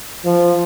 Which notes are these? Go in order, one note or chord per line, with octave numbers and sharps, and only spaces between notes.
F3